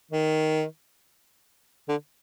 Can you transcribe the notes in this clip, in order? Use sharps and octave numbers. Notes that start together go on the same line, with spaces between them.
D#3
D3